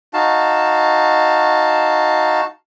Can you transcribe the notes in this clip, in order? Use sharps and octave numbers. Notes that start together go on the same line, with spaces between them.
D#4 F#4 F5 A5